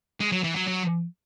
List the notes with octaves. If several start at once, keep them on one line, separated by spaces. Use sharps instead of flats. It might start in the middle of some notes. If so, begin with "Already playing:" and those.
G#3
F#3
E3
F#3
F#3